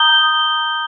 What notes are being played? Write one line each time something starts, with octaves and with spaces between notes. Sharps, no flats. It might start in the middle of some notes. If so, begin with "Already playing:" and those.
Already playing: A#5 D#6 G6 G7